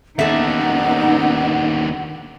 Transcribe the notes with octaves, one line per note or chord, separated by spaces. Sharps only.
D#2 D3 B3 C#4 D#4 A4 E5 F#5